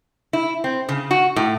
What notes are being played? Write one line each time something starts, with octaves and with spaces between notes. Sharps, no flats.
E4
C4
C#3
F#4
A2